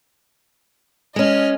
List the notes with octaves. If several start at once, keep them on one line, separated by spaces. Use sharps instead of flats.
G#3 C#4 D#5 F6